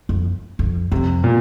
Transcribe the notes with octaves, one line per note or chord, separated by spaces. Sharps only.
F2
F2
F2 C3
A#2